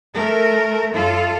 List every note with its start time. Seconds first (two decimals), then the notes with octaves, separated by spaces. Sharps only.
0.15 A3 A#4
0.93 F#2 F4 A4